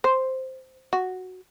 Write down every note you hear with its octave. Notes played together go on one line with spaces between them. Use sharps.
C5
F#4